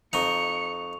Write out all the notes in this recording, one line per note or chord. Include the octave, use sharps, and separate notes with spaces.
F2 D#4 C#6 C#7 F7